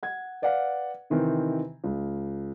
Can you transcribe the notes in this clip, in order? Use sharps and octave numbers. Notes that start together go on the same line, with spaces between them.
F#5 G#6
B4 D5 F5 F#5
C3 D#3 E3 C4
C#2